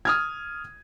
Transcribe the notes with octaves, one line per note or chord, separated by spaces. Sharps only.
D#6 F6 G#6